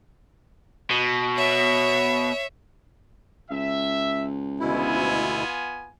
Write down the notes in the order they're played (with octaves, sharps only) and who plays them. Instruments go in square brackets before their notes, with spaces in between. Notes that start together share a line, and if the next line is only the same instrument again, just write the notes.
[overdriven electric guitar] B2
[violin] C#5 E5
[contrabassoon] C#2 [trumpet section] E5
[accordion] D2 B2 E4 [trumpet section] B3 F4 G#5